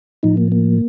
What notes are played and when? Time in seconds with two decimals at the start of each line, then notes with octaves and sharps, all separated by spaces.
0.23 A2 F3 D#4
0.37 A#3
0.52 A#3